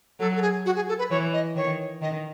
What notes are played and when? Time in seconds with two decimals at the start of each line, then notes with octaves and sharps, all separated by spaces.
0.19 F#3 A4
0.36 A4
0.41 G#4
0.65 F#4
0.75 G#4
0.88 A4
0.98 B4
1.10 E3 C#5
1.33 D#5
1.55 D#3 C#5
2.01 D#3 D#5